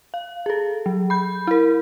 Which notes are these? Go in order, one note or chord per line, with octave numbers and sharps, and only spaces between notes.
F5
G#4 A4
F#3
B5 G6
E4 A#4